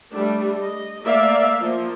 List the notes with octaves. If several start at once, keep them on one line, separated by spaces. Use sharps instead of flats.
G3 A3 D4
D#5
A3 A#3 D5 E5 F5
F3 A#3